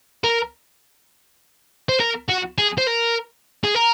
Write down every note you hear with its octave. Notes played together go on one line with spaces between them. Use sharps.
A#4
C5
A#4
F#4
G#4
C5
A#4
G#4
A#4